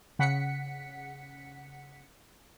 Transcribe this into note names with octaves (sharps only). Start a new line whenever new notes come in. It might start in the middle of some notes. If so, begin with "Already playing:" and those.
C#3 F#5 B6 C#7